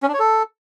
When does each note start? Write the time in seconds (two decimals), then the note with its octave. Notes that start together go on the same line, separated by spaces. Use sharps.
0.03 C#4
0.08 D4
0.14 C#5
0.19 A4